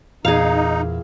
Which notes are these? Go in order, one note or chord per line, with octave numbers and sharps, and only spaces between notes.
E2 A#2 D#4 G#4 F5